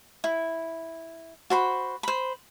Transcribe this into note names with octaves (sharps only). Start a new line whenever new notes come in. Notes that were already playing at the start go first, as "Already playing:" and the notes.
E4
F#4 C5 B5
C5 B5